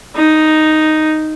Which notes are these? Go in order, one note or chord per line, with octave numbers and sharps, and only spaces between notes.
D#4